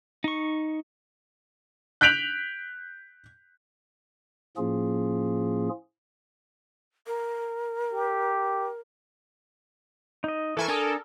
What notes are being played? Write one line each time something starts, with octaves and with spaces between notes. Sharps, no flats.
D#4 C#6
F#6 G6 B6 D7 F7 F#7
A2 F3 A#3 C#4 F4 G#4
A#4
G4
D#4 D#5
E3 E4 A4 A#4 G#5 C#6
D4 A4 A#4 G#5 D#6